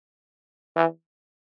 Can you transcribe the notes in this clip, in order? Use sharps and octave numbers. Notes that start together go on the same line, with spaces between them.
E3